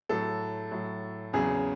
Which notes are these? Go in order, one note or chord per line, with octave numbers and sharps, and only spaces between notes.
A2 F#3 A4
A2 F#3
E2 C#3 F#3 G#4